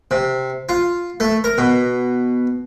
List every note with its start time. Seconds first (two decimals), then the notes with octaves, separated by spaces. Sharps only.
0.11 C3
0.69 F4
1.20 A3
1.44 A#4
1.58 B2